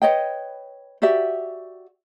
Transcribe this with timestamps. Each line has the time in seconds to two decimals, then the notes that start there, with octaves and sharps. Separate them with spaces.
0.02 B4 C#5 D#5 G5
1.02 F#4 G4 D5 E5